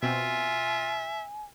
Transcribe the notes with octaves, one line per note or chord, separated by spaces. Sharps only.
B2 C4 F4 E5 G#5